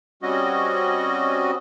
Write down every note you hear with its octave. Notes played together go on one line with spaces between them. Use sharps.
G3 C4 C#4 F#4 D#5